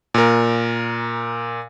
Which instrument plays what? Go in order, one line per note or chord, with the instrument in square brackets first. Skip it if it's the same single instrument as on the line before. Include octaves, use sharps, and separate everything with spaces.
[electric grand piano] A#2 A#4